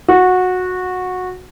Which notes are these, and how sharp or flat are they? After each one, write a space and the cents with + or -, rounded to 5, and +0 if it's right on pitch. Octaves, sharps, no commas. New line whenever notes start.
F#4 -15